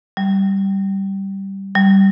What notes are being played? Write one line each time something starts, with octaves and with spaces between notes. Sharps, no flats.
G3
G3